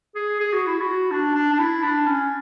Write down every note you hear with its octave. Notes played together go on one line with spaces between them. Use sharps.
G#4
G#4
F#4
E4
F#4
D4
D4
D4
E4
D4
C#4